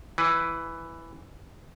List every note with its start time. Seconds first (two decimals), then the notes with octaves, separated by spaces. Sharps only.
0.18 E3 B4